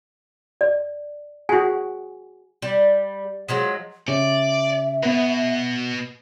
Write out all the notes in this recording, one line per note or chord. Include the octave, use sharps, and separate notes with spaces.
D5
F#4 G#4 G#5
G3
F3 F#3 G#3
C#3 C#4 G4 D5 E5
B2 B3 B4